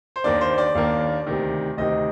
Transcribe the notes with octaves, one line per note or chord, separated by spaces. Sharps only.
C5
D#2 D#3 A#3 D4 D5
C5
D5
D#2 D#3 A#3 D4
D2 C3 D#3
D2 C3 D#3 D#5